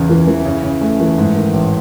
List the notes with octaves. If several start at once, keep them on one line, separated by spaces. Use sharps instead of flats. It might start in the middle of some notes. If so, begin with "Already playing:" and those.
Already playing: E2 C#3
E3
E3
C#3
C#3
A3
E3
G#2
D#3
A1